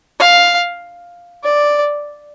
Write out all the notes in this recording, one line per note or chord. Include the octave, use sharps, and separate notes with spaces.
F5
D5